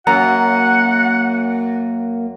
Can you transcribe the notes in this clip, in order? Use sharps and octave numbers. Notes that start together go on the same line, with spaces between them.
F#2 A#3 F#5 A#5